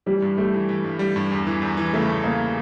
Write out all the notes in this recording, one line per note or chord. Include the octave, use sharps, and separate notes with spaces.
E3 G3
G2
G3 A3
E3
E3
G2
G3
G2
E2
E3
E2
E3
C#3 A3
E2
C#3 A#3